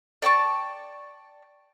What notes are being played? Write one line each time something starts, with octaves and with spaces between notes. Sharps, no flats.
D5 G5 A5 C#6